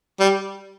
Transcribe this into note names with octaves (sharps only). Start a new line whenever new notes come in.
G3